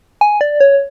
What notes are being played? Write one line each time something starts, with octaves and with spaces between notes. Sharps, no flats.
G#5
D5
C#5